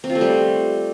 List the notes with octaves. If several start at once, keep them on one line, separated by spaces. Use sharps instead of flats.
C4
F4
A3
G3